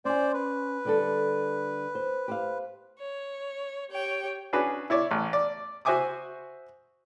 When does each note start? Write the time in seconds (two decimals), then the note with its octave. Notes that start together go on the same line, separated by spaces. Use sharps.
0.05 C#4 C5 D5 G#5
0.34 B4
0.85 D3 G3 A4
1.95 C5
2.28 G4 C5 F5
2.98 C#5
3.90 G4 C#5 G5
4.53 C#4 D4 F#4 G#4 B4
4.90 E4 C#5 D5
5.11 A1
5.33 D5
5.85 F#4 C5 E5 G#5 D6 D#6